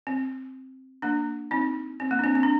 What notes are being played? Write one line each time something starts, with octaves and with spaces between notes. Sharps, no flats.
C4
A#3 D4
C4 D#4
C4
A#3
D4
C4
C4
D4